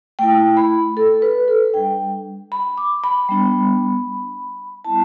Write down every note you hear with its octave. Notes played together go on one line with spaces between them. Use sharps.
A3 E4 G5
B5
A4
B4
A4
G3 D4 G5
B5
D6
B5
G3 B3 D4
G3 B3 E4 A5